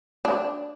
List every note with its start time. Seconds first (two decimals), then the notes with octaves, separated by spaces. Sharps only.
0.25 D4